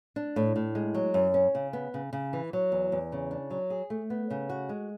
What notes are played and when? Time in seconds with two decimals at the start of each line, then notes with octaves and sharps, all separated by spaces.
0.16 D4
0.36 A2
0.56 A2
0.75 G#3
0.95 F#3
1.14 F#2
1.34 C#4
1.55 C#3
1.73 B3
1.94 C#3
2.13 C#3
2.33 E3
2.53 F#3
2.72 E2
2.92 E2
3.12 C#3
3.31 D4
3.51 F#3
3.70 G#4
3.90 A3
4.10 B3
4.31 C#3
4.49 F#4
4.69 G#3